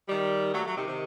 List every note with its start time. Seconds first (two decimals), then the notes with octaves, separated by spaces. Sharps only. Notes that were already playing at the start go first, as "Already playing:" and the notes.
0.08 D#3 G3
0.53 F#3 A3
0.65 F#3 A3
0.76 C3 D#3
0.87 C3 D#3